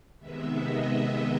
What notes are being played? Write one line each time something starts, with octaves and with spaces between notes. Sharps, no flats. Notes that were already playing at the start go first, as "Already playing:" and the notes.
C3 D#3 G#3 B3 E5
D#5
E5